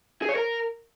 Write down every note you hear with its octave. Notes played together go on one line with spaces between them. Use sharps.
G#4
C#5
A#4